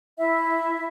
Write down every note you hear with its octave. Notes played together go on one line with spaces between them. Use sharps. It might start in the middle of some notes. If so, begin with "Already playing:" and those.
E4 E5